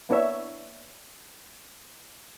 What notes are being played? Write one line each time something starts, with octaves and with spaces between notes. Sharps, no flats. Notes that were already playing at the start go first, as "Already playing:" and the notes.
A#3 B3 D4 E4 C#5 E5